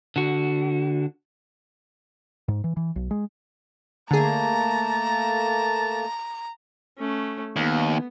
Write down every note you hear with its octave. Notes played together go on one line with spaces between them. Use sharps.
D3 F#4
G#2
E3
E3
B1
G#3
D3 A3 A#3 G#4 A5 A#5
A3 C#4
D#2 B3